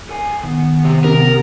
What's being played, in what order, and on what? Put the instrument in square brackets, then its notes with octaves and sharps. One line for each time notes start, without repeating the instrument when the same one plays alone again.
[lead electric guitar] A4 G#5
[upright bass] D#3 [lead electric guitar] B3
[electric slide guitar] C3
[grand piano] C3 [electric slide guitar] A#4